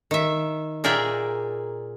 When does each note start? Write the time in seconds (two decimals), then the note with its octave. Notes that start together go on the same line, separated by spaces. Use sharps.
0.11 D#3 E5
0.84 A#2 G#4 A#4 D5 E5 G5